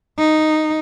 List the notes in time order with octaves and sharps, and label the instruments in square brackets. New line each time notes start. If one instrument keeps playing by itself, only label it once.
[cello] D#4